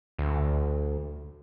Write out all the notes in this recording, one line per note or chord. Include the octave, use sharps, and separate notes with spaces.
D2